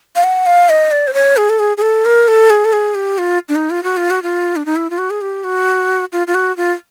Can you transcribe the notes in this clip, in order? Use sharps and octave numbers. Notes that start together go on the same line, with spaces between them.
F5
F#5
F5
D#5
D5
C5
C#5
G#4
A4
G#4
G#4
A4
A#4
A4
G#4
A4
G#4
G4
F4
D4
D#4
F4
F#4
F4
F#4
F4
D4
D#4
E4
F4
F#4
G#4
G4
F#4
F4
F4
F#4
F4